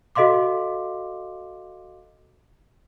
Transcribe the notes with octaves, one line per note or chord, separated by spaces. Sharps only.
F#4 A4 D#5 F5 C6 D6